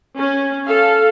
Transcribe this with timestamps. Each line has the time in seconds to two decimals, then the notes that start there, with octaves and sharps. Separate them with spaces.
0.16 C#4
0.67 A4 F5